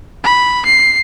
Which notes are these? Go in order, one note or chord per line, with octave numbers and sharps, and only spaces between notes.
B5
C7